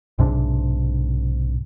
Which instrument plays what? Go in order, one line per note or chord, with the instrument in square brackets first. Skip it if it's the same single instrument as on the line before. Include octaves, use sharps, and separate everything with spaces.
[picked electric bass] B1 G#2 C3 D4